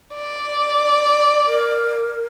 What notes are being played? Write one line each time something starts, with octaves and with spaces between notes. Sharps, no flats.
D5
A#4